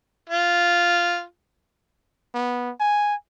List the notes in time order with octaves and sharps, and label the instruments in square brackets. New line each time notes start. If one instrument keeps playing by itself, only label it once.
[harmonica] F4
[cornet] B3
G#5